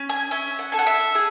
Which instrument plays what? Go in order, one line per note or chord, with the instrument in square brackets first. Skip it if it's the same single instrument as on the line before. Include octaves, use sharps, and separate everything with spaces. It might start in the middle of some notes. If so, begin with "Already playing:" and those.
Already playing: [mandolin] C#4
G#5
C#4 E5
F#5
A4 G#5
F#5
E5
G#4